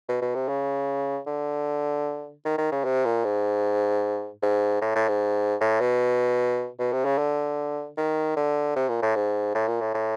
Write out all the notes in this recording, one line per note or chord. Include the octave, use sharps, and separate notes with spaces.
B2
B2
C3
C#3
D3
D#3
D#3
C#3
C3
A#2
G#2
G#2
A2
A2
G#2
A2
B2
B2
C3
C#3
D3
D#3
D3
C3
A#2
A2
G#2
A2
A#2
A2
A2